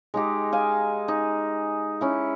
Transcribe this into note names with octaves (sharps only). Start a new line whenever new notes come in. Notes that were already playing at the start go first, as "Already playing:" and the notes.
G#3 D#4 G4
F5 G#5
D#4
C#4 E4